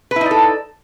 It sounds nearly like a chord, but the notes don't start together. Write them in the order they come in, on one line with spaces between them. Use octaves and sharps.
B4 E4 D#4 D5 A4